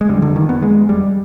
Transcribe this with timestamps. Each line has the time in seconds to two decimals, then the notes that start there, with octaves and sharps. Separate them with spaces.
0.01 G#3
0.09 F2 D3 G3
0.22 D3
0.36 D#3
0.49 B3
0.62 G#3
0.89 G3